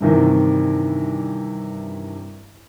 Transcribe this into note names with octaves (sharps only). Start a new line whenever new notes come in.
G2 C3 D#3 E3